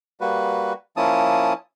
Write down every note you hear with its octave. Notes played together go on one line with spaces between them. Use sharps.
G3 A#3 F#4 B4
F3 A#3 C#4 E4 A5 D#6